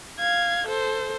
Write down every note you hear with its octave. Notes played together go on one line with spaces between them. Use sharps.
F5 G#6
A4 C5